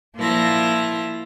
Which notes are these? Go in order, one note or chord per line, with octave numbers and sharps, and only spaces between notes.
A#2 F3 E4 F4 A#6